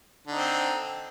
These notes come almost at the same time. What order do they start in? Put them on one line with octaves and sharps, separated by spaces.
D3 D#4 C4